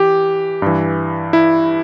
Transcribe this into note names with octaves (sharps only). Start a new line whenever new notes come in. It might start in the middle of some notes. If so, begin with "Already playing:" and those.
Already playing: E3 G4
G2 E3
E4